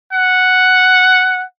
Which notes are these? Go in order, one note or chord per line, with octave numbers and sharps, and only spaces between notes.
F#5